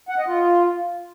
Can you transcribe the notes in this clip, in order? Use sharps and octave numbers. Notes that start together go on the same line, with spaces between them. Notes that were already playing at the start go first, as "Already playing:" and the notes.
F#5
D#5
F4